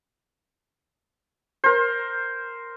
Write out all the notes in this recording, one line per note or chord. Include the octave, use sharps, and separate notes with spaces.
A#4 C5